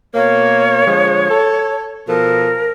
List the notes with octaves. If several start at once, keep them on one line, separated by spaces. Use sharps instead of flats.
B2 A#3 C#5
D3 F3 G#3
A4
B2 F3 A4 A#4